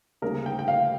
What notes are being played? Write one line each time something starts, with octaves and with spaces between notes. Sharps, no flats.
D2 C#3 G3 A#3 A#4
G5
G5
F5